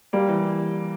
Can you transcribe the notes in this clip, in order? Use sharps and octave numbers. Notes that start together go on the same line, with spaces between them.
G3 A#3
E3